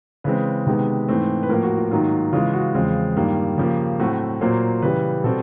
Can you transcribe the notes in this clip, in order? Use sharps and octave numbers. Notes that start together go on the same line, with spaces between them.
C#3 E3 G#3 C4 B4
C3 D#3 G#3 B3
G#2 E3 A3 C4
B4
A2 F3 A#3 A#4
F#4
F4
G#2 D#3 F#3 A#3 F4
C#3 E3 G#3 F4
F#4
E2 C#3 F3 G#3 C4 F4
G2 D#3 G3 A#3
C#3 F3 A#3 G4
A2 F#3 A3 C4 F#4
A#2 F#3 A#3 C5
C#3 E3 G3 B4
B2 G3 C4 A4